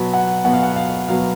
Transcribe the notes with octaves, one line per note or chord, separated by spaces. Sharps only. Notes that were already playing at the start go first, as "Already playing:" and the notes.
Already playing: B2 F#3 B3
F#5
B2 F#3 B3 F#5
F5
F#5
F5
B2 F#3 B3 F5